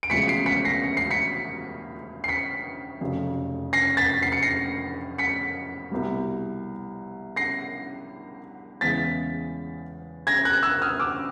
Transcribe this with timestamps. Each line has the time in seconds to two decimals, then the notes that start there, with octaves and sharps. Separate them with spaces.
0.03 D7
0.10 E1 D2 C#3 F3 G#3 B6 C#7
0.28 C7 D7
0.46 B6 C#7
0.65 A#6 C7
0.84 C#7
0.97 C7
1.11 B6 C#7
2.24 C7
2.28 B6 C#7
3.01 F1 F2 C#3 F#3
3.73 A#6 C7
3.97 A6 B6
4.22 C7
4.32 C#7
4.43 A#6 C7
5.18 B6 C#7
5.91 C2 B2 G3
7.36 A#6 C7
8.81 E2 C#3 E3 G#3 A6 B6
10.27 G#6 A#6
10.45 F#6 G#6
10.63 E6 F#6
10.81 D#6 F6
10.99 D6 E6